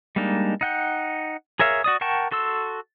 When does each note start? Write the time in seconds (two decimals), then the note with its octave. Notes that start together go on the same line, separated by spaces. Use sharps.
0.16 G3 G#3 A#3 D4 D#4
0.61 D#4 F#5 G5
1.59 G#4 A#4 C#5 E5 F5
1.84 F#4 D5 D#6
2.01 A#4 F#5 G5 A5 C#6
2.31 F#4 A4 C6 E6